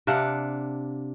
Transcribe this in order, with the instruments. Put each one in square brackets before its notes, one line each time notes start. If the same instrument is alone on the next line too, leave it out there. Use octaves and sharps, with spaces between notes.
[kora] C3 D4 F5 F#5